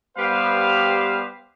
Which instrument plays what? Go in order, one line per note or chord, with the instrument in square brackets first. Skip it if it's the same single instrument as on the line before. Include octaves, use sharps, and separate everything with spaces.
[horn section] G3 B3 G4 B4 C5 F5